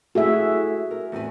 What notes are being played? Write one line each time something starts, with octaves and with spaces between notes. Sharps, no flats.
A3 E4 F#4 G#4 E5
A#4
E2 A2 G#5